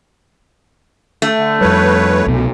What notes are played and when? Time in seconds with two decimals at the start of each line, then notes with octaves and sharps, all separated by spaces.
1.22 A3
1.38 D3
1.61 F2 G3 B4 C#5
2.26 C2 F#2 B2